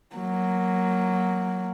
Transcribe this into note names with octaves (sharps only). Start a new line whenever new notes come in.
F#3 A#3